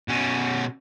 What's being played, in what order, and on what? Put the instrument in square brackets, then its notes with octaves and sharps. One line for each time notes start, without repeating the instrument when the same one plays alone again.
[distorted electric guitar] B2 C#4